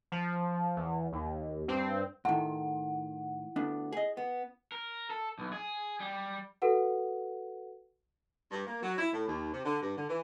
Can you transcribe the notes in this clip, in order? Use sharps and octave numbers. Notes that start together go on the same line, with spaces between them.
F3
E2
D#2
G2 C4
A2 D#3 E4 F#5
D2 B3 D4
G#4 D#5
B3
A#4
A4
B1
G#4
G3
F#4 A4 B4 F#5
G2
A#3
F#3
E4
A2
D#2
C3
D3
G2
D3
E3